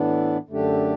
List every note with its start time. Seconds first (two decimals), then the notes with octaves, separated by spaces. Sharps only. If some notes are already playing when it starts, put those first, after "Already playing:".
Already playing: A2 E3 B3 D4
0.49 F#2 D3 A3 D4 G4